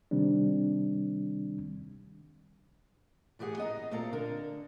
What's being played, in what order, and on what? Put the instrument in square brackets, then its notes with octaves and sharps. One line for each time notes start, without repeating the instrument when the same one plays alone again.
[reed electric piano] C3 D#3 G3 C4 D4
[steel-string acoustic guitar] A2 E3 G4 G#4 F#5
B3 D#5 A#5
A#2 A#3 C4 A4 F5 A#5
D3 A#4